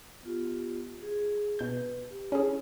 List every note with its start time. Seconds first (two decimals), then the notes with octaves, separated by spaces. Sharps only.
0.23 B3 F4 G4
1.01 G#4
1.59 B2 B4 G6
2.10 G4
2.32 C#4 E4 G#4